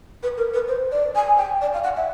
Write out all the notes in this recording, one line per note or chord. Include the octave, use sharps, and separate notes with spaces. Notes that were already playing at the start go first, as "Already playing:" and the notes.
B4
A#4
B4
C5
D5
G#5
G5
D5
F5
F#5
E5